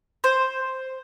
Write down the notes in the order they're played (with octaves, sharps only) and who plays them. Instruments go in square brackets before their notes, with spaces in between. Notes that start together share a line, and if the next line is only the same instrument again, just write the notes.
[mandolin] C5